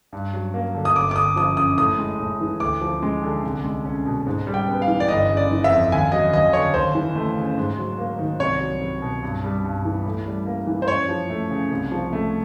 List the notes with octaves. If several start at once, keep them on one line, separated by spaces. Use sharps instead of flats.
G2
F#3
A#3
D3
D#6
G1 D6
D6
D3 D#6
F3 D#6
F#2 D#6
A2 D#6
G#3
A2
E3
D2 D6
F3
G#3
D3
C2
G#3
C#4
B2
G#2
G3
G5
B3
F5
E3
D5
G1 D#5
C#3
D5
E3
E5
F2
D#2 G#5
F#3 D#5
D#2 D#5
D3 C#5
D#2 C5
E3
A3
C#3
G#2
F#3
A#3
D#3
C2 C#5
F#3
C2
B2
G2
G3
G2
E3
A2
G3
A#3
E3
C5
F#2 C#5
F3
A3
C#3
C2
F3
A3